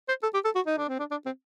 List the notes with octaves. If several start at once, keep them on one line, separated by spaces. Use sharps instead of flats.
C5
A4
G4
A4
F#4
D#4
D4
C4
D4
D4
C4